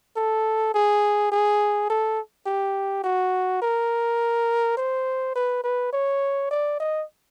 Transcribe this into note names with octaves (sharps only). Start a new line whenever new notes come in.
A4
G#4
G#4
A4
G4
F#4
A#4
C5
B4
B4
C#5
D5
D#5